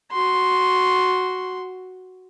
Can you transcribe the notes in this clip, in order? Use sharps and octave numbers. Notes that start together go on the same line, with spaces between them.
F#4 C6